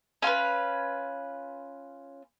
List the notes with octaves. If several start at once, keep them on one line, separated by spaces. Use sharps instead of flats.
C#4 F4 A#4 B4